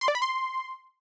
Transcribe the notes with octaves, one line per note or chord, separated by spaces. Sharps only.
C6
D5
B5
C6